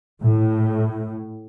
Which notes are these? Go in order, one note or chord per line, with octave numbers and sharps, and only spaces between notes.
A2